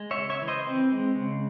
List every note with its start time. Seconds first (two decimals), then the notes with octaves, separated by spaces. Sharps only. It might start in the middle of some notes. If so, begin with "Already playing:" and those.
Already playing: G#3
0.11 C#5 E5
0.17 C#3
0.30 C#5 E5
0.42 E3
0.48 C5 D#5
0.67 C4
0.92 G#3
1.15 C#3